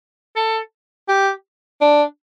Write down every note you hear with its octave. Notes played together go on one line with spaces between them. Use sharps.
A4
G4
D4